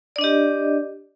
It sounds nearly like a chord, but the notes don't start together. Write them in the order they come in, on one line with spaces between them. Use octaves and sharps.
D5 D4 D#5 G4